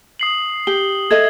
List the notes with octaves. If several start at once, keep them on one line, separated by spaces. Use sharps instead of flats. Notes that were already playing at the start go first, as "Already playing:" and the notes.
D#6 C7 F#7
G4 G7
A4 D#5 E5 G#6